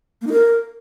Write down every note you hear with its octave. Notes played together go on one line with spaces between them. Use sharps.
A#3
D#4
A#4